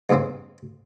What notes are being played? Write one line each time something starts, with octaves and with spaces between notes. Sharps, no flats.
E2 G2 C#3 B3 C4